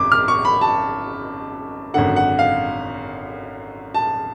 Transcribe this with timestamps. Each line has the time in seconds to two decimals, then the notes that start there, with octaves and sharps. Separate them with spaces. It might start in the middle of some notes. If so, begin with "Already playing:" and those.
Already playing: G#1 F#2 D6
0.12 F6
0.28 C#6
0.45 B5
0.61 A5
1.94 G#1 F#2 D3 F#5
2.16 F#5
2.39 F5
3.94 A5